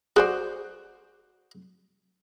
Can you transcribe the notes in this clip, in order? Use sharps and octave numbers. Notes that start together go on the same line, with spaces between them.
F#4 G#4 C5 D5